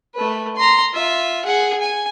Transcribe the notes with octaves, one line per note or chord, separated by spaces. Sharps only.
A3 B4
A#5 C6
F4 E5
G#4 F#5
G#5